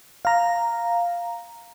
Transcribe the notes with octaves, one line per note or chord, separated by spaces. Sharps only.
F5 A#5